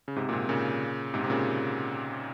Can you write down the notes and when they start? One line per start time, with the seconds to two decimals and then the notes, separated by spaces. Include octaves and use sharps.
0.08 C#3
0.16 G#2 C3
0.29 A#2
0.33 G#2 C3
0.49 A#2 C#3
1.14 G#2 C3
1.24 C3
1.30 A#2 C#3